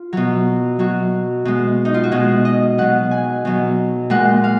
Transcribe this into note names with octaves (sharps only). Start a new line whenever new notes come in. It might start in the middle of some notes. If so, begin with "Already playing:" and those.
Already playing: F4
B2 F#3
B2 F#3 F#4
B2 G#3
D#4
F4
F#4
B2 G#3 G#4
D#5
B2 F#3 F#5
G#5
B2 F#3
A#2 G#3 F#5
F5